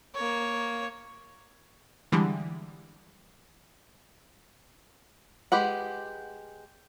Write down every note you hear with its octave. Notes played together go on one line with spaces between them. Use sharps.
A#3 C#5
D3 E3 G3 G#3
G#3 G4 B4 F#5